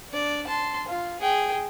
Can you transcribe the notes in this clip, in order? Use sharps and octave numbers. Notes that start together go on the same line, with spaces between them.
D4 D5
A5 C6
F4
G#4 G5